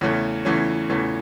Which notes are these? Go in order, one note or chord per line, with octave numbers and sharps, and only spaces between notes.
E2 C#3 E3 A3 C#4
E2 C#3 E3 A3 C#4
E2 C#3 E3 A3 C#4